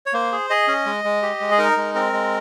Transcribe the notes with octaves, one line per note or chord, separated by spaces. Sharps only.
C#5
A#3 C5
G#4
G#4 D#5
C#4
G#3
G#3
G4
G#3
G#4
D#4 A#4
G#3
C4 A#4
G#3